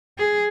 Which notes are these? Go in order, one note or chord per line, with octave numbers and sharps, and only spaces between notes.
G#4